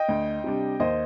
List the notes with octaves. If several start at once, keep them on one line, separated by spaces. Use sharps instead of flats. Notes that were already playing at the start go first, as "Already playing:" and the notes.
Already playing: D#5 G5
D2
C3 G3 D4
D#2 C5 D#5